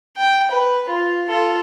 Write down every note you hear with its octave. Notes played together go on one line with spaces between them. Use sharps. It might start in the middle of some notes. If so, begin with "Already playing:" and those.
G5
B4
F4
F4 A4